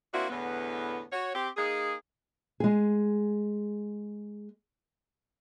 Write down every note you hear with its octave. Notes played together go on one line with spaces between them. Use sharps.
A#3 C4 D4 E4 F#4
E2 A2 D3 B3
F#4 C#5
C4 G4
A#3 D#4 G#4
G#3 G#4